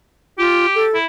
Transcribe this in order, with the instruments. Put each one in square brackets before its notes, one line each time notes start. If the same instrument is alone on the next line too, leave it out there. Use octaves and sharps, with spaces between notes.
[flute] F4 [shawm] G4
[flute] A4
[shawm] E4